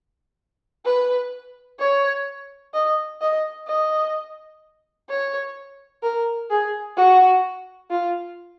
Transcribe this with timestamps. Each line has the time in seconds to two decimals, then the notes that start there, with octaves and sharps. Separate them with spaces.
0.85 B4
1.79 C#5
2.74 D#5
3.21 D#5
3.67 D#5
5.09 C#5
6.03 A#4
6.51 G#4
6.97 F#4
7.91 F4